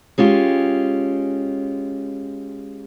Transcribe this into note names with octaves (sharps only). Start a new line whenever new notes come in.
G#3 C#4 F4 G4